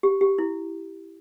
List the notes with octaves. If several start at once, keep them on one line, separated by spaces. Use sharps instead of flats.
G4
G4
E4